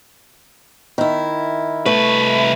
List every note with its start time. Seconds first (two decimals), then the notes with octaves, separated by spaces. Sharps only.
0.98 D#3 E4
1.86 C2 A3 B4